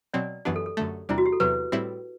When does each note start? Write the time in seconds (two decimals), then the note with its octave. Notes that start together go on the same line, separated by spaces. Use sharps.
0.14 B2 F#3 C4 D5
0.45 F#2 E3 B3 D4 G4
0.56 A4
0.66 A4
0.77 F#2 D3 A3
1.09 E2 C3 G3 D4 E4
1.18 F#4
1.26 G4
1.33 A4
1.40 E2 C3 F#3 B4
1.72 A2 G3 C4 E4